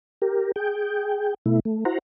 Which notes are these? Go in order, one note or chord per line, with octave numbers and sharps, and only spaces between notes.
G4 A#4
G#4 G5
B2 A3 E4
A3
E4 F#4 C5 F#5 A#5